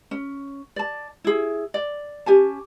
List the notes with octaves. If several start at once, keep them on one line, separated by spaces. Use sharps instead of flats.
C#4
D5 A5
E4 G#4
D5
C#4 G4 G#5 A5